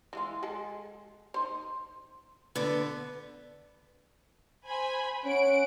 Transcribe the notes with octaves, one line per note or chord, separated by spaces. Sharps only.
E3 G#3 F4
G#3 G#4 A4
D#4 C5
D3 B3 B4 D5
C5 G#5 B5
C#4 F#5 D7